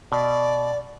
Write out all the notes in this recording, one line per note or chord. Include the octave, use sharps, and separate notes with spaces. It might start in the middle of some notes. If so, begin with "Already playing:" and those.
B2 D5